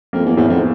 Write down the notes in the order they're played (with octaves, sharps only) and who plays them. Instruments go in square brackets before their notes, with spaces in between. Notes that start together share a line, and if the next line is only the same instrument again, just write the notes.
[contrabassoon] F2 [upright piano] A#3
[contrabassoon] E2
[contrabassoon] E2 [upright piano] A2
[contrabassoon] F2